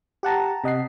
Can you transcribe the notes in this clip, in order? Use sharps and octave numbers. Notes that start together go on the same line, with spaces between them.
G4 F#5 A5 A#5
C3 D#5 F#5 C7